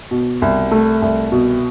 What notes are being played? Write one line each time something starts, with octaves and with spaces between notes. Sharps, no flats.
B2
C2
A3
C2
B2